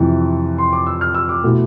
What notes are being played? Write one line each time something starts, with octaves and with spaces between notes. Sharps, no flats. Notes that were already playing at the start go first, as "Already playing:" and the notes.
Already playing: F2 C3 E3
C6
D6
E6
F6
E6
D6
B2 A3 E4